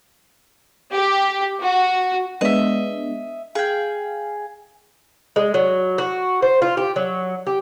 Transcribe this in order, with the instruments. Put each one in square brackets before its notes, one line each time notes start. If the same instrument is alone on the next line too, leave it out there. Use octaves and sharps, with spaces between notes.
[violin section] G4
F#4
[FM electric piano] G#3 B3 D4 [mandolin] D#5 E5
[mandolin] G#4 G5 [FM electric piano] F5
[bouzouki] G#3
F#3
F#4
C5
F4
G4
F#3
G4